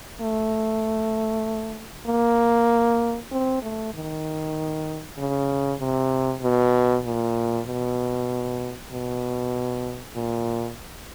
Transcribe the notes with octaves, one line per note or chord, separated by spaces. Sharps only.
A3
A#3
C4
A3
D#3
C#3
C3
B2
A#2
B2
B2
A#2